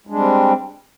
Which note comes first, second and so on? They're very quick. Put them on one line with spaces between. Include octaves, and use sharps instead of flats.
G#3 D4 G3 C4